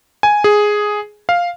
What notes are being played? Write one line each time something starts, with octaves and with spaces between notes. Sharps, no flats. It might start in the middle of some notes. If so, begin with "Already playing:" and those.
G#5
G#4
F5